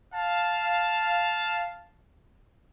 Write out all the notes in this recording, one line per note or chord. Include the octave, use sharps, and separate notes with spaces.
F5 A5